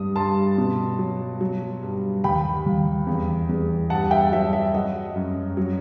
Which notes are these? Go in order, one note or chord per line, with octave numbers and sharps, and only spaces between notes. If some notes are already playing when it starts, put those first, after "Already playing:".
Already playing: G2 G3 D#6
G2 A5 C6
B2
F#3
F#3
G2
D#2 G5 B5
D#2
E2
E2
G2 F#5 A5
E5 G5
F#3 E5
E5
F#3 D#5 F#5
F#2
F#3